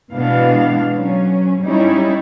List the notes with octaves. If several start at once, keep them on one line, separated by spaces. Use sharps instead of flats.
B2 E3 G#3 B3 D4 F5
F#3 C#4
G3 C#4 D#4 E4